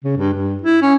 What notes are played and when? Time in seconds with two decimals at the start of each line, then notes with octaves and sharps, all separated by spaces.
0.04 C#3
0.17 G2
0.33 G2
0.62 E4
0.82 C#4